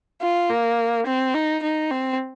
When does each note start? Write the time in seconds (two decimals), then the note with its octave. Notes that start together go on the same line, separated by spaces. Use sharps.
0.21 F4
0.50 A#3
1.06 C4
1.34 D#4
1.63 D#4
1.91 C4